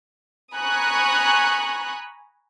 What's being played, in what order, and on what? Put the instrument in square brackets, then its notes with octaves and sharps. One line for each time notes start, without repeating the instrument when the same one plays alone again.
[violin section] G#5 A#5 B5 C#6 D#6 F#6